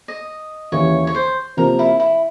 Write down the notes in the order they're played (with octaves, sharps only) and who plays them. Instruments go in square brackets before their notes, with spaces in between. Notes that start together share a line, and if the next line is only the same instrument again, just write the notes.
[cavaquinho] D#5
[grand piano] D#2 C#3 E3 [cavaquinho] C#5
[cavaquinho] C#5
C5
[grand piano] C3 F3 A#3 [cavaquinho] A#4
[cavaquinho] E4
E4